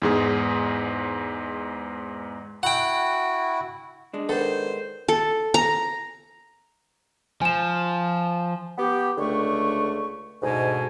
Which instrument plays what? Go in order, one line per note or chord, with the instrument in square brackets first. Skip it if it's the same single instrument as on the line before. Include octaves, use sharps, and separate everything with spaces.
[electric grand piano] E2 G#2 G#4
[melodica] E4 F#4 [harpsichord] F#5 G5
[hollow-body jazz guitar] G#3 D4
[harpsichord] D#3 B3 [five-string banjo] A4 [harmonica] C5
[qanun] A4
A#5
[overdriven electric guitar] F3 [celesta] G#5 E7
[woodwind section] B3 G4
C#2 D3 A3 C#6
D2 G#2 B2 G#5